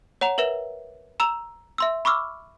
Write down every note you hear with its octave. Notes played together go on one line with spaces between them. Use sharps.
C#5 F#5 A#5 F7
A#4 B4 E5 E7
A#5 E6 E7 F7
E5 C6 E6
B5 C#6 D6 E6 F6